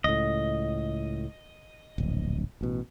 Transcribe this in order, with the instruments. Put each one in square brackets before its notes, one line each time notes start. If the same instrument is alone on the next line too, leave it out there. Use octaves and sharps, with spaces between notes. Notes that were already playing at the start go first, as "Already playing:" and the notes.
[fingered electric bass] C#2 A2 [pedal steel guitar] D#5
[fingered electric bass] D1 A#1
A1 B2